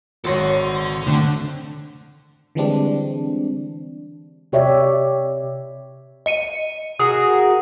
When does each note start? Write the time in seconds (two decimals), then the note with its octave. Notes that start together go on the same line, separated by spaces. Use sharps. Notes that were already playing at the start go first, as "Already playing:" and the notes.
0.25 G#1 F#4 A4 C#5 F#5 C6 A#6
1.07 D3 A3 C4
2.55 D3 E3 G3 G#3 C4 D4
4.52 C3 G4 C#5 D5 E5
6.26 D#5 C#7 D#7
6.99 F#4 G#4 A#4 D#6